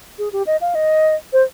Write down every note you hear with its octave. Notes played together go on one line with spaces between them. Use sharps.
G#4
G4
D#5
F5
D#5
C5